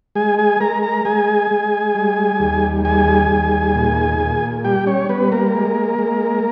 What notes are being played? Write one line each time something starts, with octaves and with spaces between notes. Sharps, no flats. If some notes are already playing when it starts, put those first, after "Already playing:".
G#3 G#4 G#5
G#4 G#5
G#3 A#4 A#5
A#4 A#5
G#3 G#4 G#5
G#3
G3
D#2
G3 G#4 G#5
D#2
A#2
A#2
G3 G4 G5
C#4 C#5
G3 B3 B4
A#3 A#4
G#3
G#3